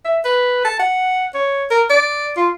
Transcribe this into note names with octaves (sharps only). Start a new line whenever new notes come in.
E5
B4
A5
F#5
C#5
A#4
D5
F4